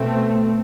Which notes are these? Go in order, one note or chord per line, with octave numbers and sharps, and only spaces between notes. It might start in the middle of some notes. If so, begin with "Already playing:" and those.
Already playing: B2 A3 C4